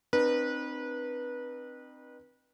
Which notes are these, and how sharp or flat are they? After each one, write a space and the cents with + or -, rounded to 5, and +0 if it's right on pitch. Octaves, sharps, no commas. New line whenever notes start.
C4 +0 D#4 -45 B4 -25